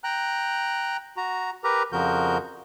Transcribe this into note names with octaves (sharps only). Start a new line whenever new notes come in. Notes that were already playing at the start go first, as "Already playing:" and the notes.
G5 A#5 F#6
F#4 A#5
G4 A#4 B4 A#5
F2 C#3 F3 F#4 A#4 G6